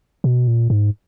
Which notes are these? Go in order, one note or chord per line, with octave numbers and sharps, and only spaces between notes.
B2
A#2
G#2